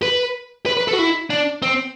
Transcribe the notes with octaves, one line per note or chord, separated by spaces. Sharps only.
B4
B4
B4
A4
F#4
E4
D4
C4